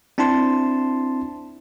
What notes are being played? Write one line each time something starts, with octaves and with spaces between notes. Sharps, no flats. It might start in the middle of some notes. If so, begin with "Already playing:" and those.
C4 D4 E4 A5 C6